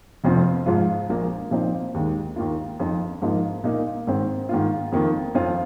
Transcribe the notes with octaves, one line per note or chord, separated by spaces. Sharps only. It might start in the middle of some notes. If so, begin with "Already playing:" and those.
F1 F2 F3 C4
G#2 F3 G#3 F4
A#1 A#2 A#3
A#2 F3 C4 D#4
D#2 D#3 G#3
D#2 D#3 A#3 F4
F2 F3 C4 D#4
G#2 F3 A#3 D#4
A#2 A#3 D#4
G#2 D#3 C4
G#2 D#3 A#3 F4
F2 D#3 A#3
F2 F3 C4 F4